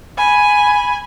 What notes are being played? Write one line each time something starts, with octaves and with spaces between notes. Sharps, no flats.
G#5 B5